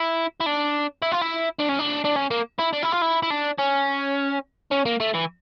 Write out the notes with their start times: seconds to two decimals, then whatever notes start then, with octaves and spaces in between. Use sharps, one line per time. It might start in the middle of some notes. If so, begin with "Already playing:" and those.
Already playing: E4
0.40 E4
0.46 D4
1.02 E4
1.12 F4
1.21 E4
1.59 D4
1.69 C#4
1.79 D4
2.05 D4
2.16 C#4
2.31 A#3
2.59 E4
2.73 D4
2.82 E4
2.92 F4
3.02 E4
3.22 E4
3.30 D4
3.58 C#4
4.71 C#4
4.86 A#3
5.00 A3
5.14 E3